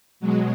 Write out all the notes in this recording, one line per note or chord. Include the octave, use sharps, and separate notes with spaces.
B2 F#3 G#3